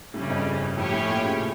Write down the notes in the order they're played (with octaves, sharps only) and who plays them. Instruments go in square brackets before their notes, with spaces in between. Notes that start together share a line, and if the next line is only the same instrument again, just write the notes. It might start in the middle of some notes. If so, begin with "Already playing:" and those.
[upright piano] A2 [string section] C#3 G3 C#4
[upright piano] G2
F2
G2
[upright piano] A2 [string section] F3 A3 C#4 G4 C#5
[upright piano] A2
A#2
C#3